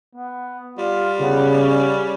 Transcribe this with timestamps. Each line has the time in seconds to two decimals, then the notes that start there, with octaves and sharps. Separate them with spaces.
0.15 B3
0.78 G3 F4
1.20 C#3 B3
1.58 C#4